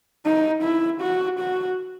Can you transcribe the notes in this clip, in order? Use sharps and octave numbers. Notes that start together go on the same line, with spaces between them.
D#4
E4
F#4
F#4